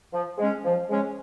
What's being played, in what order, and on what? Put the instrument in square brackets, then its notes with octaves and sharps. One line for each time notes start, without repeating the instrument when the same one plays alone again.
[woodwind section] F3
G#3 C#4
F3
G#3 C#4